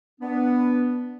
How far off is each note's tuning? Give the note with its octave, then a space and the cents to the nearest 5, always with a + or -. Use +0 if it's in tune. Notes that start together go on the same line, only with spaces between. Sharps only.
B3 +0 D4 +0